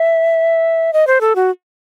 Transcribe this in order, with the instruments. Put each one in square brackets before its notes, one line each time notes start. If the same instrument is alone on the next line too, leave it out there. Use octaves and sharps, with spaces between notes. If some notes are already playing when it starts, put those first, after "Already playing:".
Already playing: [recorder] E5
D#5
C5
A4
F#4